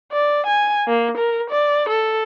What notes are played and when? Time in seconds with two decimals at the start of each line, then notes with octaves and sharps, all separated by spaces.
0.12 D5
0.46 G#5
0.87 A#3
1.17 A#4
1.50 D5
1.89 A4